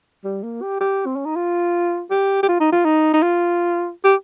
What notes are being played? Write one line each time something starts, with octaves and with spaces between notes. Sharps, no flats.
G3
A#3
G4
G4
C4
C#4
D#4
F4
G4
G4
F4
D#4
F4
D#4
D#4
F4
G4